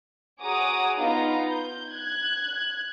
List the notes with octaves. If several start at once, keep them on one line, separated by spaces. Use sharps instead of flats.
F#4 G#4 C#5 A#5 D6 D#6
B3 D#4 F4 B4 F5 A#5
G6
F#6 G#6